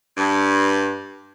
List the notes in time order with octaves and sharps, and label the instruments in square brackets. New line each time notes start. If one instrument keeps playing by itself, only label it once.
[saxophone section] G2